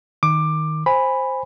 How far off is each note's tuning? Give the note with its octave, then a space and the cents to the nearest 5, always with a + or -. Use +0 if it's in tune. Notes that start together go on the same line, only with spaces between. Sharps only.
D#3 +0 D6 +15
C5 +5 G#5 -15 B5 +0